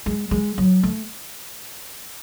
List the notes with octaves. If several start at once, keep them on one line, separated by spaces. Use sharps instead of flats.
G#3
G#3
F#3
A3